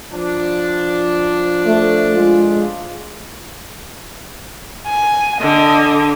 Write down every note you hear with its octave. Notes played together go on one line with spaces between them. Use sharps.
F3 D4
A3
G#3 F4
G#5
D3 D#5